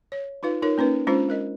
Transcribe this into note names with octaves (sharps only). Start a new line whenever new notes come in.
C#5
D#4 F4 B4 F5
D#4 F4 A#4 C#5
A#3 C#4 D#4 B4
G#3 C#4 D4 F4 C5
G#3 A#4 D#5